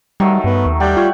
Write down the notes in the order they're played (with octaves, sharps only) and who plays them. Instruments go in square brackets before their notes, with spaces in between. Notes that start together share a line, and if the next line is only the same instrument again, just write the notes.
[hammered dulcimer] D#3 F#3 A3 [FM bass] G3
[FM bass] G2 [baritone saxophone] B3
[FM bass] D#2
[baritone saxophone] G3 [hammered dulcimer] D5 F#5 G5
[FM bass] F4 [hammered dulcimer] C#5